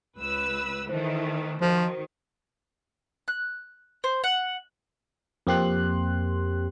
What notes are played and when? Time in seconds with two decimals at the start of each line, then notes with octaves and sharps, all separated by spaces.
0.18 C#2 B4 E6
0.89 D#3 E3 A3 C5
1.61 D#3 F3 F#4 C5
3.28 F#6
4.04 C5
4.24 F#5
5.47 F2 A#3 C4 G4 C6 F#6